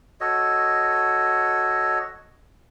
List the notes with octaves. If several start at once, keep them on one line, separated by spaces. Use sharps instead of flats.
F#4 A4 C#5 D#5